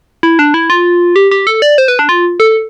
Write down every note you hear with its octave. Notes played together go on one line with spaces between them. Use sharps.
E4
D4
E4
F4
G4
G4
A4
D5
C5
B4
D4
F4
A4